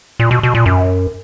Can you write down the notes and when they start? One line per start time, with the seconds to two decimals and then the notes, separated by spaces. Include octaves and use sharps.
0.20 A#2
0.31 B2
0.43 B2
0.55 A#2
0.66 F#2